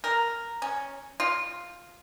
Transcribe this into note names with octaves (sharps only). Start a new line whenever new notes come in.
A#4
C#4
F4